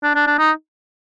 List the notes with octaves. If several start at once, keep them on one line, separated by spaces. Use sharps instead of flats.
D4
D4
D4
D#4